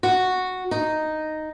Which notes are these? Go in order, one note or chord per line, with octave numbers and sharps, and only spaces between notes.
F#4
D#4